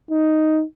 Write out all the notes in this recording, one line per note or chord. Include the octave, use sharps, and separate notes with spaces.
D#4